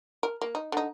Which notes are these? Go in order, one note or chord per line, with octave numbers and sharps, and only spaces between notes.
A#4
A#3
D#4
D3 D#4